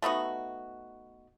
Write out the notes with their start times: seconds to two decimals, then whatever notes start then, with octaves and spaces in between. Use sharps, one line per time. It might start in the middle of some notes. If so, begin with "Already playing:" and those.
0.02 A3 B3 D#4 F#4